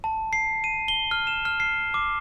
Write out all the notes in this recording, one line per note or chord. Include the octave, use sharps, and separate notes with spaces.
A5
C7
D#7
G7
F6
E7
F6
C7
D6